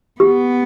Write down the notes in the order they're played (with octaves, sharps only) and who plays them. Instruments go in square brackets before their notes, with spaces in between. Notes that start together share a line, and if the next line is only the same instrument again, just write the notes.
[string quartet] B3 [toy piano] G4